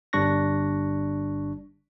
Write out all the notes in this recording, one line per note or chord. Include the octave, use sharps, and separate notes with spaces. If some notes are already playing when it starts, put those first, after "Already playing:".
G1 G3 D4 C#6 F#6 A#6